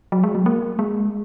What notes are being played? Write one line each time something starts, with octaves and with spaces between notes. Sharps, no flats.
F#3
G#3
F#3
A#3
G#3